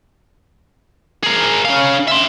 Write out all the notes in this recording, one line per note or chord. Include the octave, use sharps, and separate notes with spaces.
G#4 A#4
C#4 F5
E5 C6